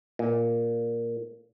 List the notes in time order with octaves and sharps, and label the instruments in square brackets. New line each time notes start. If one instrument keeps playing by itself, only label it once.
[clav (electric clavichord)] A#2